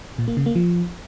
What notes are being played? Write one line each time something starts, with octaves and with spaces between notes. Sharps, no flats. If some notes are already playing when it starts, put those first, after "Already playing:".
A#2
A#3
C#3
A#3
F3